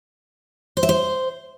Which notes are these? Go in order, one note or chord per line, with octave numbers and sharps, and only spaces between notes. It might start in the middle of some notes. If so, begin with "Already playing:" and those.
C5
E5
C5